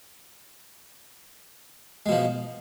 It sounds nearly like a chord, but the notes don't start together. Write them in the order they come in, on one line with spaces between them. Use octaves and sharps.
G#3 B2 F3